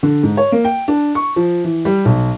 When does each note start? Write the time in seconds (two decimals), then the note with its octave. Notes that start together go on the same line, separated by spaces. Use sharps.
0.03 D3
0.23 G#2
0.37 C#5
0.52 A#3
0.64 G5
0.88 D4
1.15 C#6
1.36 F3
1.64 E3
1.85 G3
2.05 B1